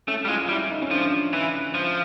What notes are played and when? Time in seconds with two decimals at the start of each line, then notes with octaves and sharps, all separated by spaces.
0.07 A3 C#4
0.25 G3
0.28 G#3 F4
0.43 F4
0.49 G3 E4
0.70 D#4
0.82 C#4
0.91 F3 D4
1.33 E3
1.74 F3